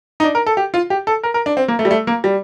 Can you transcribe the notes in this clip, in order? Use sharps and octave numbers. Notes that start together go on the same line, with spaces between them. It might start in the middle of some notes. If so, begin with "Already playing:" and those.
D#4
D4
A#4
A4
G4
F4
G4
A4
A#4
A#4
D4
C4
A#3
A3
G3
A3
A#3
G3